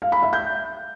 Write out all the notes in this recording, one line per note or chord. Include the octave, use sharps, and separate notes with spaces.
F5
B5
E5
G6